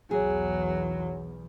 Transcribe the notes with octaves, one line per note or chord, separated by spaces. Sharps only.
B1 E2 F#3 G#4